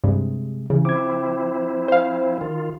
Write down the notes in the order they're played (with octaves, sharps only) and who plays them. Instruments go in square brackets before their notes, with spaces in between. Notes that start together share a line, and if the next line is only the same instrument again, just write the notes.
[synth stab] G2 [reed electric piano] C3 G#3
[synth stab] C#3 [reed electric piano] E3
[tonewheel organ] F3 C4 E4 [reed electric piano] D6 G#6
[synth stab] C5 F5
[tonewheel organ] D#3 F4